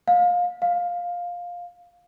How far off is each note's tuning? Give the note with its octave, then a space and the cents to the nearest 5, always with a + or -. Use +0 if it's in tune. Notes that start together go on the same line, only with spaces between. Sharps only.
F5 +25
F5 +10